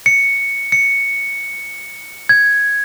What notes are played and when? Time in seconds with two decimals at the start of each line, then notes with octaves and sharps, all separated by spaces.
0.06 C#7
0.72 C#7
2.29 G#6